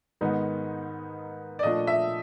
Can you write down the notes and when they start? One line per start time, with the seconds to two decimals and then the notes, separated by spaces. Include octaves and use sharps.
0.21 G#2 D#3 G#3 B3 D#4
1.59 D5
1.63 A#2 F3 A3 D4 D#5
1.87 E5